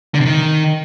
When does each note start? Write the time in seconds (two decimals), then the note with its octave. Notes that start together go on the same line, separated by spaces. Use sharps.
0.15 D3
0.20 C3
0.26 D#3